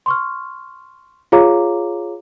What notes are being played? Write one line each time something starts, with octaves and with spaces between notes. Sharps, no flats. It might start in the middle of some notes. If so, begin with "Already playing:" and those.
C6 C#6 F6
F4 G#4 C#5 F5 A#5 D6